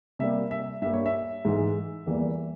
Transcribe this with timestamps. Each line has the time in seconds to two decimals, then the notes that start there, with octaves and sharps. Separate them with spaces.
0.19 C3 G3 A#3 E5
0.51 E5
0.82 G2 G3 A#3 E5
0.94 C#5
1.06 E5
1.45 G#2 E3 G#3
2.06 E2 E3 G3 A#3